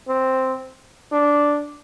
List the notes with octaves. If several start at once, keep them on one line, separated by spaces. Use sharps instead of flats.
C4
D4